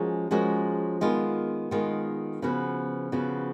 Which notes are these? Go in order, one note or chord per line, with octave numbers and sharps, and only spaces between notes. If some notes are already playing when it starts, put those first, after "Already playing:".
Already playing: F3 G#3 C#4 F#4 A#4
F3 G#3 C#4 F#4 A#4
D#3 G#3 B3 F4
D#3 G#3 B3 F4
C#3 F3 B3 F#4 B4
C#3 F3 B3 F#4 B4